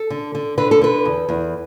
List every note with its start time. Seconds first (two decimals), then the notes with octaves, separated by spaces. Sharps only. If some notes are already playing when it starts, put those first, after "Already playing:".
Already playing: A4
0.10 D3
0.35 D3
0.58 D3 B4
0.71 A4
0.81 D3 B4
1.05 E2
1.29 E2